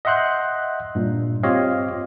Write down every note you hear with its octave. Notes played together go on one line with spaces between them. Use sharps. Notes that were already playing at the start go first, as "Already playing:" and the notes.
D#5 E5 F#5 C6 F#6 G6
G2 A#2
C4 F4 G4 C#5 D#5 F5